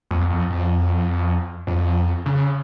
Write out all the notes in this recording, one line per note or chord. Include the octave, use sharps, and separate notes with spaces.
F2
F2
F2
F2
C#3